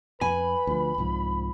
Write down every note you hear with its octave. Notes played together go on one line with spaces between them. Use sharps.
F2 B4 G#5 B5
D2 F3
C2 G#2 F3